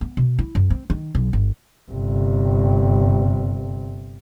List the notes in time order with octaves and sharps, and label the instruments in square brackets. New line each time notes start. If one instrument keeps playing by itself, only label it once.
[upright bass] B3
B2
E4
F#2
C4
D#3
B1
G1
[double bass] G1 C3